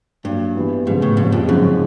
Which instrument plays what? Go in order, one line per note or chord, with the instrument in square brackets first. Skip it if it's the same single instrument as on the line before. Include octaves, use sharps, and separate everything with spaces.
[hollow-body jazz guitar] G2 [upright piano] F#3 A#3 D4
[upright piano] E3 G3 B3 E4
[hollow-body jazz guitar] G#2 [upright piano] C#3 F3 G#3 B3
[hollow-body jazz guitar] A2
[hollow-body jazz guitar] G#2 [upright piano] C3 F3 A#3 C#4
[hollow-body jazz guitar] F2
[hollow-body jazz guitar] F#2 [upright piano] C#3 F3 G#3 C4 D#4